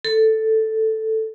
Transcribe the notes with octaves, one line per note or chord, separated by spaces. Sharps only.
A4